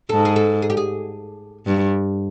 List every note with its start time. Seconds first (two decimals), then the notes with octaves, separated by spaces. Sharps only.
0.09 G#2 A4
0.25 G#4
0.36 A4
0.62 G#4
0.70 G4
0.77 G#4
1.67 G2